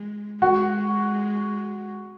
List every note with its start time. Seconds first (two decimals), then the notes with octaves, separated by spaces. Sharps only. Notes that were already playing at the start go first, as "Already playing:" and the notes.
Already playing: G#3
0.42 G#3 F#4